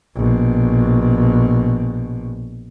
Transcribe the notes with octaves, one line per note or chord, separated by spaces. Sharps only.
A#1 B2